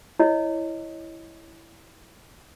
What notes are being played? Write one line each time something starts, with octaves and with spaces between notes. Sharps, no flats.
E4 C#5 D#5